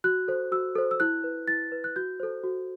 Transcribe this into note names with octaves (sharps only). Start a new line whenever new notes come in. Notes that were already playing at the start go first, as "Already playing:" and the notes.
F#4 F#6
A4 C5
F#4 E6
A4 C5
E6
E4 F#6
B4
E4 A6
B4
F#6
F#4 G6
A4 C5
F#4